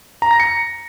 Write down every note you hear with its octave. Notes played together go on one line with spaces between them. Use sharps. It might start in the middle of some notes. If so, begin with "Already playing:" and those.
A#5
A#6
C#7